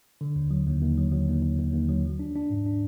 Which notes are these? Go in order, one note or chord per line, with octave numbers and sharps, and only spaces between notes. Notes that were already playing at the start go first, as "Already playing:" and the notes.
D3
D#2
F#3
D#2
D#2
F#3
F#3
D#2
D#2
D#2
D#2
F#3
F3
D4
D4
G#2
D4